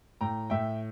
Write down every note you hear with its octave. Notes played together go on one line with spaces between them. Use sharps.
A2 G5 A#5
A2 E5 G5